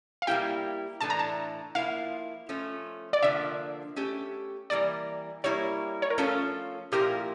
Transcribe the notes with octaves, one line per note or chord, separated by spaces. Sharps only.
F5
G3 A#3 E4 G4 G5
A2 E3 A3 D4 A5
A#5
A5
F3 A#3 E4 F5
F3 A3 C#4
D5
D3 F3 A#3 E5
A3 C#4 G4
E3 G3 A#3 D5
G3 A#3 E4 C#5
C#5
A#4
F3 A3 C#4 F4 A4
A#2 F3 A#3 E4 G4 A#4